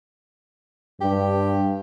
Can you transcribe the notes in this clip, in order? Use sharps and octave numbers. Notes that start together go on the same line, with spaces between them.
G2 G4